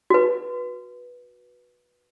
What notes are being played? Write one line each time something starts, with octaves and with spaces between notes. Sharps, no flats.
F#4 B4